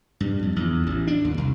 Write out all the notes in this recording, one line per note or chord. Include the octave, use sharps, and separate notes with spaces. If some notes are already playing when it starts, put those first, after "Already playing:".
G2
F2
E2
A1
D4
D#2
C2